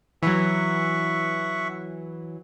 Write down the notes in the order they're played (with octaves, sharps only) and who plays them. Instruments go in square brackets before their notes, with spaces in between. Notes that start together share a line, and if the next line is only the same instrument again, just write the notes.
[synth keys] E3 F#3 [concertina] E5 F#5 C#6